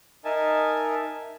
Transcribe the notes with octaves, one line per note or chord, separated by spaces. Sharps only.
D#4 A#4 D#5 E5 G#5 A5